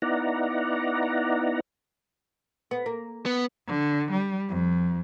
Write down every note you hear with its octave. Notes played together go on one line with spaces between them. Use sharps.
B3 D#4 E4 D5 F#5 A#5
B3
A#3
B3
D3
G3
F2